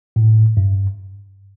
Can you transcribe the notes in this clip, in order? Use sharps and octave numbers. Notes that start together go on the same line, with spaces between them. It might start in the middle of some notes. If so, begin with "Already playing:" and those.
A2
G2